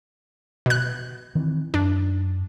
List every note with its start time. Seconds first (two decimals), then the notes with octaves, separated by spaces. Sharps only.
0.66 B2 F#6
1.35 D#3 E3 C4
1.74 F#2 D4